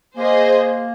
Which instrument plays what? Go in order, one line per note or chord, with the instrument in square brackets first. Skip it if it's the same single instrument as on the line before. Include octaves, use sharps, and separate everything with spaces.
[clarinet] A#3 [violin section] G#4 C5 D#5